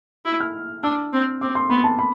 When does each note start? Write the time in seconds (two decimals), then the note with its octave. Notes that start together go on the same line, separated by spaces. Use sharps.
0.25 E4
0.40 F6
0.83 D4 E6
1.13 C4
1.41 C4 D6
1.55 C6
1.70 B3 B5
1.84 A5
1.99 B5